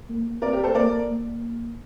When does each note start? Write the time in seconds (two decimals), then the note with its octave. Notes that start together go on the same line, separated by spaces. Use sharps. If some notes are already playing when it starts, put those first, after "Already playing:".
0.09 A#3
0.42 C4 A#4 D5
0.52 G4 A#4
0.63 A4 C5
0.75 A#3 A#4 D5
1.06 A#3